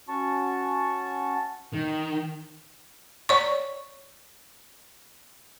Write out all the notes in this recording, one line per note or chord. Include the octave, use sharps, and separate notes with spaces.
C#4 F#4 A5 C#6
D#3
C#5 D5 C#6